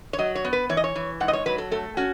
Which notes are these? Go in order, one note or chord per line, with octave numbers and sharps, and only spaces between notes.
C#5
F#3 D#5
C#5
B3
B4
E3 C#5
D#5
C#5
E3
G#2 F#5
D#5
C#5
F#3 B4
A4
A3 A4
C#4 F#4